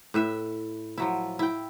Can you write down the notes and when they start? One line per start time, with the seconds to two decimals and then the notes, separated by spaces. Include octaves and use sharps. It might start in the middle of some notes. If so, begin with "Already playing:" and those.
0.14 A2 B4 E5
0.98 F3 F#3 E4
1.39 E4 G5